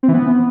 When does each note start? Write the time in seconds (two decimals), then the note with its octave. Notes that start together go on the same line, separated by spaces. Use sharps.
0.03 C4
0.08 E3
0.14 B3